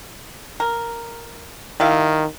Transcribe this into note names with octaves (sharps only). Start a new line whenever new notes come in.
A#4
D#3 G3 E4 F5